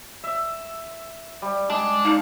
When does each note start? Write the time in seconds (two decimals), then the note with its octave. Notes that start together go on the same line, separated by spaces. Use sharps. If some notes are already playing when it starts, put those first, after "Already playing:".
0.24 E5
1.42 G3
1.70 G#3 D4
2.04 D#4 F5 A5